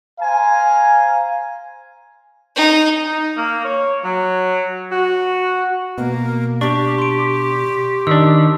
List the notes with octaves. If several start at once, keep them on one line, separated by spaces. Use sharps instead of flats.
C5 F5 G#5 A#5
D#4
D#4
A#3
C#5
F#3
F#4
B2 A#3
D4 G4 C#6
C6 D7
D#3 D4 E6